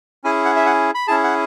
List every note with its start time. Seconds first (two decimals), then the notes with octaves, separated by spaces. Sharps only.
0.24 C#4 E4 G#4 G#5
0.45 F#5
0.56 E5
0.66 F#5
0.95 B5
1.07 C#4 E4 G#4 A5
1.24 F#5